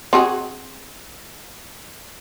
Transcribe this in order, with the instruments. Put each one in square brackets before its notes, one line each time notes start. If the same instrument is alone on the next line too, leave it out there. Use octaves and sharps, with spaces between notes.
[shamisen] C4 F#4 G#4